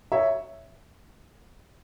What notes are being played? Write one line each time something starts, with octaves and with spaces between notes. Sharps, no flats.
C#5 E5